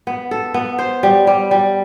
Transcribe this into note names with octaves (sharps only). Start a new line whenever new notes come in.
B3
A4
B3
C5
G3
G3
G3